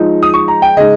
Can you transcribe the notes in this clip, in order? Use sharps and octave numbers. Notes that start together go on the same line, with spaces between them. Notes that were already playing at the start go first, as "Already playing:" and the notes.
Already playing: F3 G#3 D#4
D#6
C#6
A#5
G5
C#3 G#3 D#4 D#5